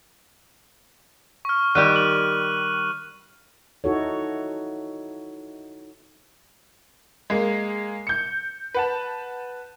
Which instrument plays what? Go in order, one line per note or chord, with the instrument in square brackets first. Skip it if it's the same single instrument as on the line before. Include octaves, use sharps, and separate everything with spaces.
[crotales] C#6 F6
[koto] D#3 G3 G4 [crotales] F#6 D#7
[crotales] F#7
[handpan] D#4 E4 F#4 A4 C#5
[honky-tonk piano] G#3 A#3
G6 C#7
B4 F#5 A5